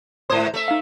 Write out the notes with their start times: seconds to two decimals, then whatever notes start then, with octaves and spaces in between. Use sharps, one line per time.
0.30 G#2 C5 C6 D#6 G#6
0.54 A3 E5
0.68 D#4 F5